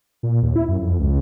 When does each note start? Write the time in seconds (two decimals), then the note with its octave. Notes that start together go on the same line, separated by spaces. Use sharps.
0.23 A#2
0.43 D#2
0.56 E4
0.68 F#2
0.81 F2
0.99 C#2